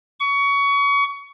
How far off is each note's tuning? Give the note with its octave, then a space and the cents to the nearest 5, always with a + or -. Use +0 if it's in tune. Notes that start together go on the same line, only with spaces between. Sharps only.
C#6 +25